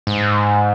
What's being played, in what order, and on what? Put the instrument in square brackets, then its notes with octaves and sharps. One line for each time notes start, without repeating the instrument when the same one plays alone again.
[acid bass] G#2